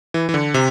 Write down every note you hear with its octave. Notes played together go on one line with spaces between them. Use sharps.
E3
E3
D3
C3